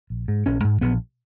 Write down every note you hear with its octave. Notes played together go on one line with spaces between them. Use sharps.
A#1
G#2
A#1 C#4
G#2
A#1 B3